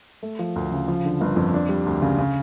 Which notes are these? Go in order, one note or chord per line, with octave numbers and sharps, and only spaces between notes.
A3
F3
D2
C#3
F3
D3
G1
F2
D4
G3
D2
C#3
C#3